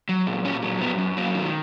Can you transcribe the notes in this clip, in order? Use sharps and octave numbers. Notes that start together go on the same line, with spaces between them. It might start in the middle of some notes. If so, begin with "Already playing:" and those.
F#3
A#2
A#2 C#4
F#3
F#2 B3
F#2
F#3 A#3
D#3